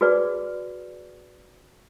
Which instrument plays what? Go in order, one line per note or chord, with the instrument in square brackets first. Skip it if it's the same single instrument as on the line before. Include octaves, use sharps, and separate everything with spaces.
[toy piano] F#4 G#4 B4 D5